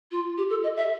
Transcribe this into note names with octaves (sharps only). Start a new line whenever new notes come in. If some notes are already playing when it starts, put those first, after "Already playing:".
F4
G4
A4
D#5
E5